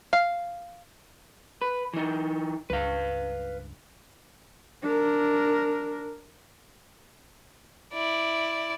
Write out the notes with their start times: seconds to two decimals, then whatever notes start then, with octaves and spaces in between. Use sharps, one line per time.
0.13 F5
1.62 B4
1.93 E3 D#4
2.70 C#2 G2 B4 F5
4.83 D4 A#4
7.93 E4 D5